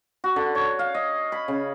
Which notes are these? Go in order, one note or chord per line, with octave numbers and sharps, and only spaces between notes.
F#4
D3
C#5
F5
D#5
B5
C#3